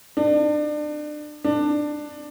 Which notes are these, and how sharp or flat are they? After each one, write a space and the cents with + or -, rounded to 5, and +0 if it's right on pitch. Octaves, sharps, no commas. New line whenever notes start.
D4 +30
D4 +15